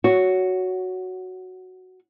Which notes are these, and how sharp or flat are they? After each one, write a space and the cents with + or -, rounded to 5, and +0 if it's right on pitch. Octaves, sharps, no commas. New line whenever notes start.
F#4 +0 C#5 +15